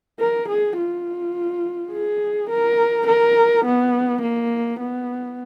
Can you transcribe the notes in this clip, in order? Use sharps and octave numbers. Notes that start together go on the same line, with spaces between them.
A#4
G#4
F4
G#4
A#4
A#4
B3
A#3
B3